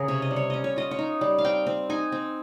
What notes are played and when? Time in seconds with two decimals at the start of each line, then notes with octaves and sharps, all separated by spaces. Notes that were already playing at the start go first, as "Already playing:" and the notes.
Already playing: C#3 G#4 A#4
0.08 C3 C#5
0.22 D#5
0.31 G3
0.36 C#5
0.50 C#4 D#5
0.64 C#5
0.76 F4 D#5
0.91 C#5
0.99 D#4
1.21 G3
1.38 F5
1.44 C4 G5
1.67 C4
1.90 D#4 G#5
2.12 C4